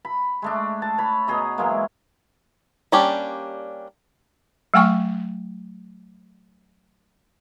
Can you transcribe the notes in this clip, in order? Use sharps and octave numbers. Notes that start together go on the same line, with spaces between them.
B5
G#3 A3 D4
A5
C#5 B5
B2 G#4 D#5 A#5
E3 F#3 G#3 A#3
G3 A#3 C#4 D4 G4
F#3 A3 G5 G#5 C#6